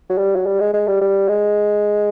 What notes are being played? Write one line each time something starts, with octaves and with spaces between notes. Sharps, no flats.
F#3
G3
F#3
G3
G#3
G#3
G3
G3
G#3